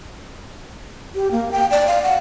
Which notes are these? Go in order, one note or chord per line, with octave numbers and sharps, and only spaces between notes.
G4
A#3
G5
D5
F5
F#5